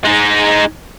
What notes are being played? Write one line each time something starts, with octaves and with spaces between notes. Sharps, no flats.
G#3 D#4